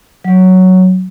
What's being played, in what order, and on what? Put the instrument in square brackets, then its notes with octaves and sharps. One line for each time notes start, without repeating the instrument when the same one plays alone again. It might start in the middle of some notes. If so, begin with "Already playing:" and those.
[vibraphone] F#3